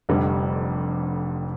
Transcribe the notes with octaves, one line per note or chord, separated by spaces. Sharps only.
F1 F2 D3 G3